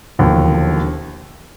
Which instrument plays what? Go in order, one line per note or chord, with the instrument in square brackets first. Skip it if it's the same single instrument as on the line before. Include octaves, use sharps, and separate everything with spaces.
[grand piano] E1 D#2 D3 F3